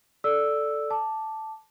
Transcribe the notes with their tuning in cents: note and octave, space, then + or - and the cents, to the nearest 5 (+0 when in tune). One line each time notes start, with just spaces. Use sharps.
A4 +0 D5 +0 E6 +0
A5 +0 D6 +0